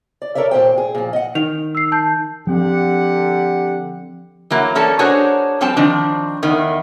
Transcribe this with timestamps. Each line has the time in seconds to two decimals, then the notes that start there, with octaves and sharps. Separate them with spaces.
0.22 D5
0.35 A4 A#4 C#5 D5 E5
0.51 D#2 A#2 G#3 C5 G5
0.78 G#4
0.95 A#2 F3
1.13 D#5 F#5
1.35 D#3 F7
1.75 E6 C7
1.92 A5 G6
2.47 D3 F3 C4 G4 F#5
4.50 E3 F#3 A#3
4.75 A#3 C#4 A4 D5 A5
4.99 D4 F#4 G#4 A#4 C5 C#5
5.61 F3 G3 C4 G5 A5
5.77 D#3 F3 C4 D4
6.43 E2 D#3